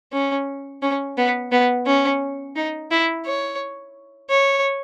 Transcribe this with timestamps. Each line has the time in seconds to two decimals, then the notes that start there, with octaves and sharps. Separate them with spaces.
0.12 C#4
0.82 C#4
1.17 B3
1.52 B3
1.86 C#4
2.56 D#4
2.91 E4
3.26 C#5
4.30 C#5